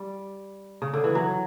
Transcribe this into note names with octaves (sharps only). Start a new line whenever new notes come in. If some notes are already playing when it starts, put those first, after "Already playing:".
Already playing: G3
C#3
D3
E3
F#3